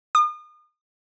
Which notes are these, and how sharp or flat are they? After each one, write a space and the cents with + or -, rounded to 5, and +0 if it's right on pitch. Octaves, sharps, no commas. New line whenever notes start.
D#6 -35